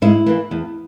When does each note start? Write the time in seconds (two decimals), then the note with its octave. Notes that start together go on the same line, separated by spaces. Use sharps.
0.02 G#2 E4
0.26 E3 A#3
0.51 E2